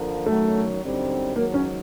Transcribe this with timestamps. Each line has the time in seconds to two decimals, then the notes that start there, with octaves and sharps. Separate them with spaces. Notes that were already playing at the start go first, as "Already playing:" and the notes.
Already playing: D3 F3 A#3
0.26 F#2 D#3 F#3 A3
0.81 F#2 D3 G3 C4 D#4
1.35 G#2 D#3 F#3 A#3
1.54 C#4